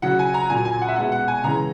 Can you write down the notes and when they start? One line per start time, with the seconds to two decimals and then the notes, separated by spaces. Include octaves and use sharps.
0.02 C#3 F#3 F#5
0.19 G#5
0.34 A#5
0.50 A#2 F#3 G#5
0.65 G#5
0.82 F#5
0.88 E5
0.96 B2 G#3 F#5
1.12 F#5
1.28 G#5
1.44 C#3 E3 G#3 A#5